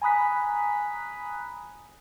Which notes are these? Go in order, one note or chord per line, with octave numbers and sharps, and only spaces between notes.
G#5 A#5 B5 D#6 F#6 B6